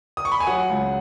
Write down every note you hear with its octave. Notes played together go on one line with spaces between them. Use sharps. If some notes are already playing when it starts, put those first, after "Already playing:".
D#6
C#6
B5
G#5
F#3 F#5
C#2